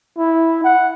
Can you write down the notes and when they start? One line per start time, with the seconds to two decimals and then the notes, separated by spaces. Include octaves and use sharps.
0.18 E4
0.64 F#5